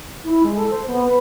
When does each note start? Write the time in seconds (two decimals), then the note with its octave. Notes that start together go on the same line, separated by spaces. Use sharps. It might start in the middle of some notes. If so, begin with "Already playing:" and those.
0.24 E4
0.43 G#3
0.56 A4
0.70 C5
0.87 B3
1.05 B4